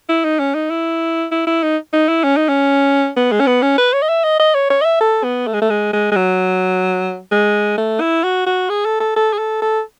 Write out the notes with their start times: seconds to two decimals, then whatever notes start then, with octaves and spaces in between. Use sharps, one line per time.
0.09 E4
0.24 D#4
0.39 C#4
0.55 D#4
0.70 E4
1.32 E4
1.47 E4
1.63 D#4
1.93 D#4
2.08 E4
2.24 C#4
2.37 D#4
2.49 C#4
3.16 B3
3.32 G#3
3.40 C#4
3.47 B3
3.63 C#4
3.78 B4
3.93 C#5
4.02 D#5
4.09 E5
4.24 D#5
4.40 D#5
4.54 C#5
4.70 C#5
4.81 D#5
4.85 E5
5.01 A4
5.24 B3
5.47 A3
5.54 G#3
5.62 A3
5.70 G#3
5.93 G#3
6.12 G#3
6.16 F#3
7.32 G#3
7.78 A3
8.01 E4
8.24 F#4
8.46 F#4
8.70 G#4
8.86 A4
9.00 A4
9.16 A4
9.33 G#4
9.39 A4
9.62 A4